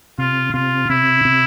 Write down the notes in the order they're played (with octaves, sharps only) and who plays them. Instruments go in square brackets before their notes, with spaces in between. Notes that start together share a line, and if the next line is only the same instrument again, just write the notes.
[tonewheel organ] C3 [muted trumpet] F4
[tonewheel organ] C3 [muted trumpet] F4
[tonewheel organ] C3 [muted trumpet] E4
[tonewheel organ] C3